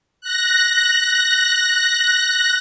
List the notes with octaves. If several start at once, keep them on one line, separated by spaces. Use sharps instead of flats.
F#6 A#6